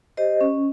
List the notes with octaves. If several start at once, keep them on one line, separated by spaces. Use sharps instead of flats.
G4 C5 D#5
C#4